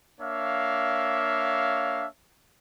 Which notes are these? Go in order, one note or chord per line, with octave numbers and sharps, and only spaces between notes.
A#3 D4 C#5 E5 F5